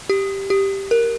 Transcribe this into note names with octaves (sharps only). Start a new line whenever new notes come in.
G4
G4
A#4